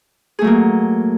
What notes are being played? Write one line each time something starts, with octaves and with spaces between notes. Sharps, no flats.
F#3 A3 A#3 G#4